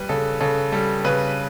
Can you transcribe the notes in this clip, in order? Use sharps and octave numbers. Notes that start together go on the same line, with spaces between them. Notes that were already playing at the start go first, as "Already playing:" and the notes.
Already playing: G3 B4
C#3 A4
C#3 A4
G3 A4
C#3 B4